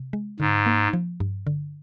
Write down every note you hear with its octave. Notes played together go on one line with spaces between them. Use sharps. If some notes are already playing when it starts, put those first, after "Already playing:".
Already playing: C3
G#3
G#2 D3
A#3
F3
G2
D3